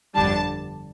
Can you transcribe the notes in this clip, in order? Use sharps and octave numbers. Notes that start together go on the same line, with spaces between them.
G1 F2 D3 G3 D4 A5